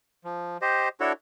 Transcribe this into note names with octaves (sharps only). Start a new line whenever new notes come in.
F3
G4 C5 D#5
D4 E4 F#4 A4 C#5